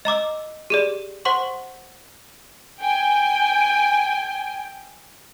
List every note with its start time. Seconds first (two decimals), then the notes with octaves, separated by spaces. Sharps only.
0.05 D#5 A#5 D6 E6
0.70 G4 G#4 D5
1.25 C5 F#5 C6 C#6
2.79 G5 G#5